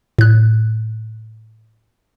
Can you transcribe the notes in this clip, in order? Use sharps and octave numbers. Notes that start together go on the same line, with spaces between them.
A2 F#6